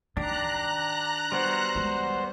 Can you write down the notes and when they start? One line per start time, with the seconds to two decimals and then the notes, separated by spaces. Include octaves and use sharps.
0.17 D#3 D4 G4 A#5 F#6
1.32 G3 B3 F#4 C5
1.75 D#3 G#3